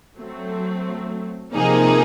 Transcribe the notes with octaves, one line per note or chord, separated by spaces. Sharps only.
F#3 A3 C4
C3 F3 A#3 D#4 G#4